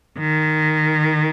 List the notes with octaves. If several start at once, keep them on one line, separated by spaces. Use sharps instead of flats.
D#3